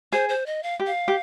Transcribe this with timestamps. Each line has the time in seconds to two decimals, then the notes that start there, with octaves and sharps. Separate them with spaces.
0.13 G#4 C5
0.29 C5
0.46 D#5
0.63 F5
0.80 G4
0.87 F5
1.08 G4